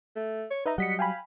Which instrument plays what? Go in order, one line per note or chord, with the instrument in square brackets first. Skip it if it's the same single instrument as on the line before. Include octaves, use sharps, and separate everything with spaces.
[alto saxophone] A3
C#5
[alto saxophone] D#4 [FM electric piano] B4 E5 A#5
[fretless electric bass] F#3 G3 [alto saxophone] D#5 [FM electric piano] F#5 B6 C#7
[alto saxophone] F5 [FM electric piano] G5 G#5 B5